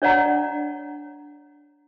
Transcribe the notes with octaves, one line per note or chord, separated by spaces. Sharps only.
D4 C#5 D5 F#5 A#5